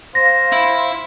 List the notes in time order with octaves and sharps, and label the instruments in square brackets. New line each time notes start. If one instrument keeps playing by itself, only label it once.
[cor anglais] C5 [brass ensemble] F5 [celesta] A#6
[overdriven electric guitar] E4